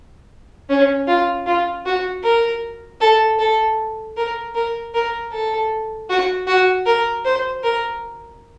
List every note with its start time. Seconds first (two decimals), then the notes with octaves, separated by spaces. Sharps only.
0.69 C#4
1.08 F4
1.46 F4
1.86 F#4
2.24 A#4
3.01 A4
3.39 A4
4.17 A#4
4.55 A#4
4.94 A#4
5.32 A4
6.10 F#4
6.47 F#4
6.86 A#4
7.25 C5
7.63 A#4